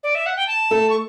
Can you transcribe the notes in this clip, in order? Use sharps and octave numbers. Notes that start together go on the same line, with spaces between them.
D5
E5
F#5
G5
A5
A3 A4
C#6